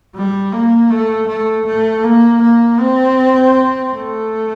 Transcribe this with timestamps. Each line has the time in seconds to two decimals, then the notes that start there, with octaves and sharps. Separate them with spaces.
0.16 G3
0.52 A#3
0.90 A3
1.28 A3
1.66 A3
2.04 A#3
2.42 A#3
2.79 C4
3.93 A3